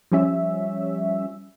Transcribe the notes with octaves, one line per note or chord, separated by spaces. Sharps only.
F3 G3 C#4 E5